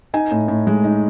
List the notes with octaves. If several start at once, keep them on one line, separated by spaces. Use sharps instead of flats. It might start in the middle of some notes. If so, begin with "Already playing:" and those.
D#4 G#5
A2
A2
G#3
D#4